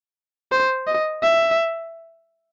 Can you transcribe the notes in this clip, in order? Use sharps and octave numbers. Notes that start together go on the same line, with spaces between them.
C5
D#5
E5